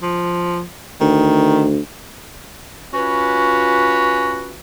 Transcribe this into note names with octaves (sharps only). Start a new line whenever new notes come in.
F3
D2 D#3
C#4 F4 F#4 B4